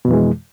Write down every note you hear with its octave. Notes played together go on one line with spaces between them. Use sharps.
F2 B2 E3 G#3